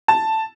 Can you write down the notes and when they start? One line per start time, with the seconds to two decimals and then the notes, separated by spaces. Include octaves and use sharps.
0.08 A5